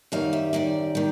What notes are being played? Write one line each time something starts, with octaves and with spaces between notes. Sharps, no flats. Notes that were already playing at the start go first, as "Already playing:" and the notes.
F#2 D#3 G3 F5
E5
F#2 D#3 G3 D5
D#3 G3